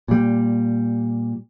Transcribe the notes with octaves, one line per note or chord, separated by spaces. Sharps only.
A#2 G3